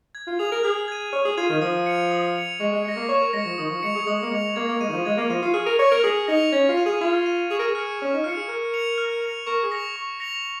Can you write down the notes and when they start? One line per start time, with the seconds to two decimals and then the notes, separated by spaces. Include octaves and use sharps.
0.15 G#6
0.27 F4
0.39 G#4 F7
0.51 A#4
0.63 G#4 F6
0.88 G#6 D#7
1.12 C#5 F6
1.25 G#4
1.37 F4 G#6 D#7
1.49 D#3
1.62 F3 D#6
1.86 C#7 F7
2.11 D#6
2.36 C#7 F7
2.60 G#3 C#6
2.72 G#3
2.84 G#3 A#6 C#7
2.96 A#3
3.09 C#5 C#6
3.21 A#4
3.33 G#3 A#6 C#7
3.45 F3
3.58 D#3 D#6
3.70 F3
3.83 G#3 C#7 F7
3.95 G#4
4.06 G#3 D#6
4.22 A#3
4.31 G#3 C#7 F7
4.56 A#3 G#6
4.68 A#3
4.80 G#3 D#7
4.89 D#3
4.93 F3
5.05 G#3 G#6
5.17 A#3
5.29 F3 D#7
5.42 F4
5.54 G#4 F6
5.66 A#4
5.79 C#5 A#6 C#7 F7
5.91 A#4
6.03 G#4 F6
6.27 D#4 A#6 C#7 F7
6.52 C#4 G#6
6.69 F4
6.77 D#7
6.86 G#4
7.01 F4 G#6
7.26 D#7
7.51 G#4 C#6
7.59 A#4
7.67 G#4
7.75 F6 C#7
8.00 C#4 C#6
8.14 D#4
8.24 F4 F6 C#7
8.37 G#4
8.48 A#4 F6
8.74 C#7 F7
8.98 F6
9.22 C#7 F7
9.46 A#4 C#6
9.63 G#4
9.71 A#6 C#7 F7
9.96 C#6
10.20 A#6 C#7 F7